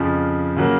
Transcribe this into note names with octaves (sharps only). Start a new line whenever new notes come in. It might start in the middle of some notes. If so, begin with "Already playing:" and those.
Already playing: F2 C#3 F3
C#3 F#3 A#3